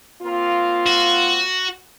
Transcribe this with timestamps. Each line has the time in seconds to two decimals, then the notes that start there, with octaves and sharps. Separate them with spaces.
0.22 A#3 C4 F4
0.86 F#4